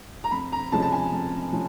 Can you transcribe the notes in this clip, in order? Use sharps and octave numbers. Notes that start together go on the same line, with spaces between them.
A#5
F2 B5
A#5
C3 F3 G#3 C#4 A5
A5
G#5
F2
C3 F3 C#4